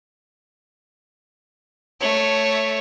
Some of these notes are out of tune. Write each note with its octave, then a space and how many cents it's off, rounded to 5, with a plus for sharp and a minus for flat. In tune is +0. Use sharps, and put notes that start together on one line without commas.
A3 +0 C#5 +0